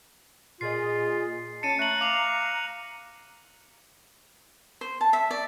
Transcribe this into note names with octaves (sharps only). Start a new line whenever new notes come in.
A#2 F4 G#4 D#5 C7
C#4 A5 A6 C#7 D#7
A3 A#5 F#6 F#7
F5 D6 F7
C5
A5
E5
D5